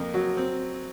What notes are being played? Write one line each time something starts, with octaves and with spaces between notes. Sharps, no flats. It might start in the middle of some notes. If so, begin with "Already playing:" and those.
Already playing: F2 A#3
F#3
C4